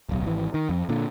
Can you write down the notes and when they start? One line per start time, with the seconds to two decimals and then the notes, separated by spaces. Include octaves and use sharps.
0.09 D1 B1
0.26 G#1 E3
0.54 D#3
0.69 F2
0.89 A#2 D3